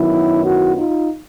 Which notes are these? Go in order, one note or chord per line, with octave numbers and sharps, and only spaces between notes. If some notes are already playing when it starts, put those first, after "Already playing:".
Already playing: F#2 D#3 F#3 B3 E4
E4 F#4
D#4 F4